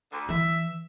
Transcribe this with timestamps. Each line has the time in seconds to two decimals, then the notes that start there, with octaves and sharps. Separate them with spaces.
0.12 D2 D3
0.29 E3 E5